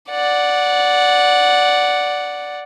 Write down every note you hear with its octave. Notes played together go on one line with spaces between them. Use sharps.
D5 F#5